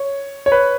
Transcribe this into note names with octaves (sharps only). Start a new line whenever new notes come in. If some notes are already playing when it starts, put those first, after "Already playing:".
Already playing: C#5
C#5
B4